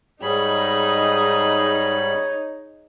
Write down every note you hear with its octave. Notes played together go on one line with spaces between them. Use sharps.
G#2 G3 D#4 G#4 C#5 B5